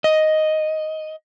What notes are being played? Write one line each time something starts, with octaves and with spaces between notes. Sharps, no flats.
D#5